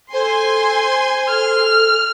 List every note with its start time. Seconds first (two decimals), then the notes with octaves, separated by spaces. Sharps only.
0.13 A4 C5 G#5 C6
1.28 A4 F6